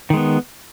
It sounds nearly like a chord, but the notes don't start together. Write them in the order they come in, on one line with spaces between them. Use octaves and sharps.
D#3 G#3 B3